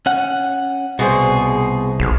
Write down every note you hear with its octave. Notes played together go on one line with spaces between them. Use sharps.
C#4 F#5
C2 B2 G#4 C5
B1